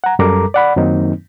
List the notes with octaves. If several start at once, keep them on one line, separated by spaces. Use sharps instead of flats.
F#5 A#5
F#2 G3 A4 A#4 A#5 D6
D5 F#5 B5
F#2 D#3 F#3 A#3 C4 D#4